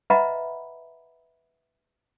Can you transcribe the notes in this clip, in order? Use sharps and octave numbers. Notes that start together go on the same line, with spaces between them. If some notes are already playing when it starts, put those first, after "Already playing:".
B4 D#5 E5 F#5 A#5 B5